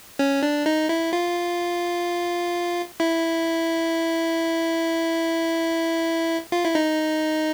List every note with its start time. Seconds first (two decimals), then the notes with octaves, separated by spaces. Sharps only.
0.19 C#4
0.43 D4
0.66 D#4
0.89 E4
1.13 F4
3.00 E4
6.52 F4
6.64 E4
6.75 D#4